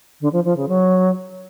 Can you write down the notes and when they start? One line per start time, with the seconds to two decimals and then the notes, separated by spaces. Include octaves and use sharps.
0.21 D3
0.33 F3
0.45 F3
0.57 C#3
0.69 F#3